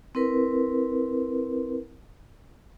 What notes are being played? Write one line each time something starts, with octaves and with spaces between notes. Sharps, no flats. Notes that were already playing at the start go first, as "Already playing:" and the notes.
C4 E4 A#4 B4